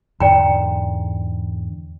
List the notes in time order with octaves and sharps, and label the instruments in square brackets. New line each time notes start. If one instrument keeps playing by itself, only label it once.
[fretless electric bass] E2 G#2 D3 [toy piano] D5 G5 A#5